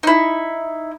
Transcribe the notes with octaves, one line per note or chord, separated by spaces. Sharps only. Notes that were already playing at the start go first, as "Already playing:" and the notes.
D#4 E4